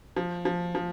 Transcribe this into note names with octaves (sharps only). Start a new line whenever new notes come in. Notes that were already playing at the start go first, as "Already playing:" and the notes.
F3
F3
F3